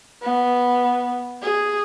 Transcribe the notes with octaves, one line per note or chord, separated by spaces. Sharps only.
B3
G#4